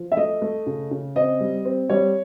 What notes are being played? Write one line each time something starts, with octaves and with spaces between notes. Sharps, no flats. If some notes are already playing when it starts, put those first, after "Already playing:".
Already playing: F3
E5
A3 D#5
A3
C#3
C#3
C4 D#5
G3
C4
G3 C#5